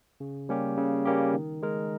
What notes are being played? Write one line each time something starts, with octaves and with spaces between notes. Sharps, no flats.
C#3
G3 A#3 C#4 G4
C#3
G3 A#3 C#4 G4
D#3
G#3 D#4 A#4